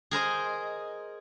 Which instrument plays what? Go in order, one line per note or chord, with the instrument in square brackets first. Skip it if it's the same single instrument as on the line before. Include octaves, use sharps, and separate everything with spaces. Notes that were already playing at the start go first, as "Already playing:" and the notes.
[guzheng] G#4 A#4 C5 D#5